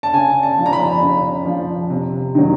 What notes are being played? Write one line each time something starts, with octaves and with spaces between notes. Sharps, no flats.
A5
C#3 G#5
A5
F3
A#5
B5
C#3
F3
C3
D#3 F#3